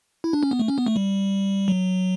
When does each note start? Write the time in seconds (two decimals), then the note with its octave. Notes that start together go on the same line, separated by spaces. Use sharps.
0.24 E4
0.33 D4
0.43 C#4
0.51 B3
0.59 A3
0.68 C#4
0.78 B3
0.86 A3
0.96 G3
1.68 F#3